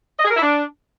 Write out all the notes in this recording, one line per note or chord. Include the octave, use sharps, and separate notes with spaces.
D#5
G#4
A#4
E4
D4